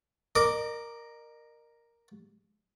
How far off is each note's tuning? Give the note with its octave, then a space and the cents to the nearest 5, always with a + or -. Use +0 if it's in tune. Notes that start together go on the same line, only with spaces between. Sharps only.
A#4 +0 D#5 -40 D6 +0